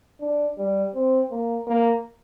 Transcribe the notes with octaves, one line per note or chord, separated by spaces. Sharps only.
D4
G3
C4
A#3
A#3